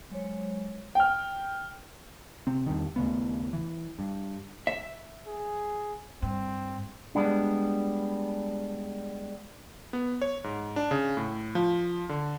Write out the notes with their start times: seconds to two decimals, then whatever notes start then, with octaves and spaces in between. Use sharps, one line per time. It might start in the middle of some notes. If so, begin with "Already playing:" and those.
0.10 F#3 G#3 C5 C#5
0.95 G5 F6
2.47 C3 C4
2.66 E2 G2 D#3
2.96 D#2 C#3 A3 B3
3.53 E3
3.99 G2
4.67 E5
5.27 G#4
6.22 G2 C4
7.15 G3 G#3 B3 D4
9.93 B3
10.22 C#5
10.44 G#2
10.76 D4
10.91 C#3
11.17 A2
11.55 F3
12.09 D3